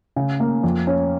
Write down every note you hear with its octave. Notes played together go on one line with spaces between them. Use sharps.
C#3
A#3
F2
C#4